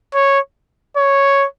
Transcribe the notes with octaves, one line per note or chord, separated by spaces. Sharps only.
C#5
C#5